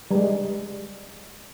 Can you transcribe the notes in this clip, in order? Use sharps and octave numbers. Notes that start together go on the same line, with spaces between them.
G3 G#3